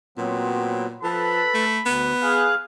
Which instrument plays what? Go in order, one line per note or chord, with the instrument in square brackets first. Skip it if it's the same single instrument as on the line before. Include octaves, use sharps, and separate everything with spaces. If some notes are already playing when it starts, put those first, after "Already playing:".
[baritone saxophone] A#2 [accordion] F#3 B3 C4
[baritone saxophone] F3 [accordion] A4 B4 A5 [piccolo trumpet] B5
[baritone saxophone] A3
[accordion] D2 [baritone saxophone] B3
[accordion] G#4 F#6 [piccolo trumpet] F5